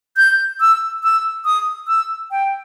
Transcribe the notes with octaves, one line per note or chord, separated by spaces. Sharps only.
G6
E6
E6
D#6
E6
G5